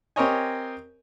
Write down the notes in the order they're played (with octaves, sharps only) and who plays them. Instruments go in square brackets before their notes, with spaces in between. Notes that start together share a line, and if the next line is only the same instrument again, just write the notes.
[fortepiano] C4 G4 A#4 C#5 D#5 G#5